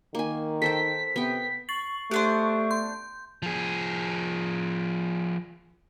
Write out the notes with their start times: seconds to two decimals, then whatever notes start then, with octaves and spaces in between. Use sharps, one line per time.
0.15 D#3 A#3 G#5
0.62 A4 C5 G5 B6
1.16 C3 B3 G5 B6
1.69 C#6 A6 C7 F#7
2.11 A3 B3 D4 G4 C5
2.71 C6 G6
3.43 F3 G#4